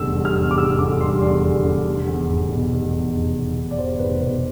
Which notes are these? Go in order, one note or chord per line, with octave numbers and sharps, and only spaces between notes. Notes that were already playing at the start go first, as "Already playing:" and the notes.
Already playing: F1 E2 D3 G3 E6
G3
F6
E2
D6
F1 E6
D3 D6
G3 C6
E2 D5
F1
D3
F1
E2
F1
B2
F1
E2
F1
B2
F1
D5
E2 C5
F1 B4
B2 B4